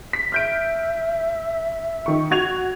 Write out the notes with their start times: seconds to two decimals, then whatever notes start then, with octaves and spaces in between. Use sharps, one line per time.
0.13 B6
0.32 E5 F6 G6 D7
2.06 D#3 C#6
2.31 F#4 G#6 F7